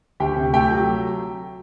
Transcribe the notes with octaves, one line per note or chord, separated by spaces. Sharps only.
D2 G4 G5
C3
A3 G4 G5
F#3